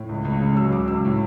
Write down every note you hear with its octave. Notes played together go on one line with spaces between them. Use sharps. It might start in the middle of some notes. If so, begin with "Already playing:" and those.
Already playing: A2
C#2
C#2
C#3
F#3 E6
C#2 D6
C#2 E6
A2